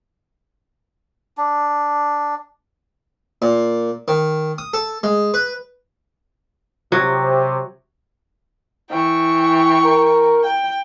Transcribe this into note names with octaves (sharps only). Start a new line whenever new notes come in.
D4
A#2
D#3
D#6
A4
G#3
B4
C3 F#3
E3 G5 C#6
A#4
G5